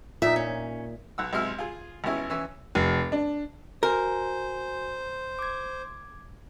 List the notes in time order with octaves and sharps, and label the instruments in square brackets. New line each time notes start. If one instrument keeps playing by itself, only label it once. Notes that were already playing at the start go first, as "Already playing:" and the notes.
[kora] A#2 D#4 [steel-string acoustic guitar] E5
[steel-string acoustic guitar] C#4
[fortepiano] B1 F#5 E6
B1 C3 G#3 E5 F6
F4 G#4
G#1 B3 C#4 E4 G#4
E3 C#4 E5 E6
[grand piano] F1
D4
[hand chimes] F#4 G#5 [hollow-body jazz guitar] A#4 [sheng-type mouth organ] C5
[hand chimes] D6 G#6